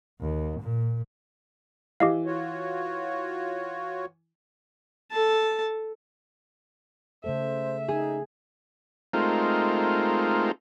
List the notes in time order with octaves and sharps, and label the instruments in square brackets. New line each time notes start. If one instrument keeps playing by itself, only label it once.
[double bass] D#2
A#2
[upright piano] E3 [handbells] G4 D#5 F5
[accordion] F4 F#4 C#5
[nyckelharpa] A4 A5
[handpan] C#3 A3 A4 [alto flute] C5 [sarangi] E5
[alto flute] D#4 [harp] G#4
[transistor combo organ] G#3 A3 C4 D#4 F4 A#4